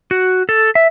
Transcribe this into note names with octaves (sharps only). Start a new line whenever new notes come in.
F#4
A4
E5